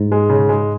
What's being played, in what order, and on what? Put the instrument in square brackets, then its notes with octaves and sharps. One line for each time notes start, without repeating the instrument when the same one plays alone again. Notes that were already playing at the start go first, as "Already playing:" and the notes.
Already playing: [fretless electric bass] G#2
[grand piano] G#3
C#3
G#3